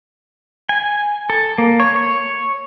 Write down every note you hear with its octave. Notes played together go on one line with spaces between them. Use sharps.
G#5
A4
A#3
C#5
C#5